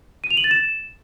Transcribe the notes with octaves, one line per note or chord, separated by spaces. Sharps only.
D#7
F7
F#7
A6
E7